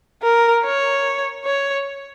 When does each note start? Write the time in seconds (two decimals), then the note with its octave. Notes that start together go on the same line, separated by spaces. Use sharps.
0.23 A#4
0.64 C#5
1.44 C#5